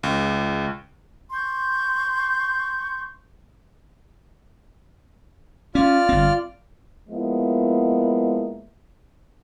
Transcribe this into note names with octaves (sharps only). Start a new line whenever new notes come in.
C#2
C6 C#6 G6
C#4 F4 D5 F6
G1 C4
F3 G#3 A#3 B3 E4